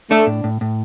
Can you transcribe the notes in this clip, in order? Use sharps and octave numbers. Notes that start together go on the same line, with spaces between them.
A3 D4
A2
A2
A2